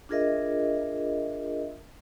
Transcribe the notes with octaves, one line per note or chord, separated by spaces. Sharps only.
D4 F4 G#4 A#4 D#5 E5